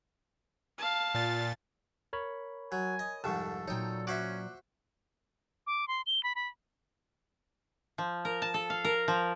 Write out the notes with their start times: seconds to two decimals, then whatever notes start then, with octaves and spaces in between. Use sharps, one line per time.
0.78 F5 A5
1.15 A#2 A6
2.13 A#4 C#5 B5
2.72 F#3 G#5
2.99 D#5
3.24 C2 F2 G#2 A4 A5 C#6
3.68 A#2 F#3 D#4 C#5 G5
4.07 C#4 F#4 C5 E5 D6 F#6
5.67 D6
5.88 C6
6.07 G7
6.23 B5
6.35 B5
7.98 F3
8.25 A#4
8.42 A5
8.54 A4
8.70 F5
8.85 A#4
9.08 F3